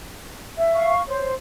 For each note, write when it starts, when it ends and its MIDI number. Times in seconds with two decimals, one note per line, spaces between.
0.58 0.92 76
0.73 1.02 77
0.73 1.02 85
1.08 1.34 72
1.08 1.29 73